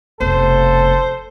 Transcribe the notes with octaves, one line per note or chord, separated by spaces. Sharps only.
F1 B2 A4 C5